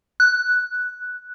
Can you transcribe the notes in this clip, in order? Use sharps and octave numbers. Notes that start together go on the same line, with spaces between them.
F#6